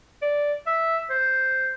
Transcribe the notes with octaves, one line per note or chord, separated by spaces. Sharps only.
D5
E5
C5